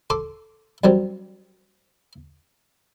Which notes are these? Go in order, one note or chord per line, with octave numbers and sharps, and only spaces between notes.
A4 C6 D6
F#2 F#3 G3 C4